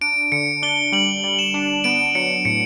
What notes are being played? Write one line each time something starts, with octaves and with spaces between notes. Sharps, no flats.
D4 D7
D3 C#7
D4 G7
G3 F#7
G3
E7
D4
B3 D7
F#3 C#7
A2 C#7